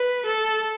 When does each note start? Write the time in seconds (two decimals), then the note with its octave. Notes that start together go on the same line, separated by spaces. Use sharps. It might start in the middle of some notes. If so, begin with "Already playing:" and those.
Already playing: B4
0.25 A4